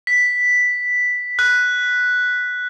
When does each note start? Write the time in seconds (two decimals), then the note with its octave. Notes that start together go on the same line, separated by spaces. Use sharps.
0.07 B6
1.39 F#6